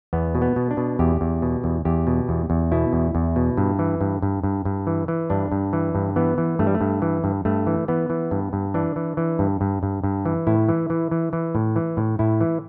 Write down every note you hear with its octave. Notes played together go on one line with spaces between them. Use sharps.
E2 B3
B2
B3
B2
D4
B2
E2 G4
E2
B2
E2
E2 G4
B2
E2
E2
B2 E4
E2
E2
B2
G2
E3
G2
G2
G2
G2
E3
E3
G2 D4
G2
E3
G2
E3 B3
E3
G2 A3
G3
A3
G2
E3
G2
G2 A3
E3
E3 B3
E3
G2
G2
E3 D4
E3
E3
G2
G2
G2
G2
E3
A2 E4
E3
E3
E3
E3
A2
E3
A2
A2 E4
E3